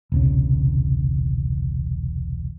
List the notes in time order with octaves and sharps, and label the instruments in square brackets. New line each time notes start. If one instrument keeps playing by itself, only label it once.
[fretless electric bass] E1 C2 C#3